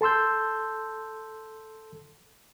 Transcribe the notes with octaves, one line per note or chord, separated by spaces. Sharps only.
A4 A5 C6 E6 G6